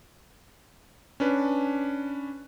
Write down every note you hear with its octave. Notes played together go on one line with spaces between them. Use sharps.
C#4 D4 B4